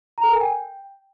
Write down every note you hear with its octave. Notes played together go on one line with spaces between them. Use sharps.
A#5
A4
A#4
G#5
G5